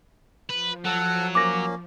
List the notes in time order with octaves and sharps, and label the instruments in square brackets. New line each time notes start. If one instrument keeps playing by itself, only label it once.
[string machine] F3 [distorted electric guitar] B4
[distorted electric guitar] F#3 [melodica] A4 F#5
[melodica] A#3 C#4 [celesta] D6 A#6